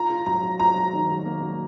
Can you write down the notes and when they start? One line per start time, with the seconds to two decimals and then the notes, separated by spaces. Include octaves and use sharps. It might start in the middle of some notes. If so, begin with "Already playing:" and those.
Already playing: F4 A#5
0.10 F4
0.26 F#3 A#5
0.43 F#3
0.59 F4 A#5
0.76 F#3
0.93 D#3
1.10 F#3
1.26 A#3
1.42 F#3